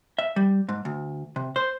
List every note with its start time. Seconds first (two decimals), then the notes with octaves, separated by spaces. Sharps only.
0.19 E5
0.36 G3
0.69 G#2
0.85 D2
1.36 C3
1.56 C5